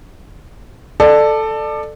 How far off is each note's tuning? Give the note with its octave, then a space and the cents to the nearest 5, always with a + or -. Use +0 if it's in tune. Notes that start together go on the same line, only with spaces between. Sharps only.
A4 +0 D5 +25